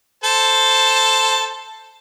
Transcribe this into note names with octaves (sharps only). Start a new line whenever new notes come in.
A4 C5 A5